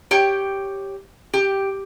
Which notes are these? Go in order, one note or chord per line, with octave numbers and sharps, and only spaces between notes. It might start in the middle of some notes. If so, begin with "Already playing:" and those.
G4 C#5 G5
G4